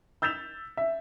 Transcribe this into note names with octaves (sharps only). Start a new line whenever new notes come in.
E6 G6 A6 B6 E7 F7
E5